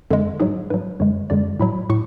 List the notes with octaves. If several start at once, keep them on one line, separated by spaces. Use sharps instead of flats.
F2 D3 G#3
G#2 F#3 G#4
G#2 F#3 B4
F#2 D3 G#3 C#5
F#2 D3 G#3 D5
A2 F#3 B5
A2 C#6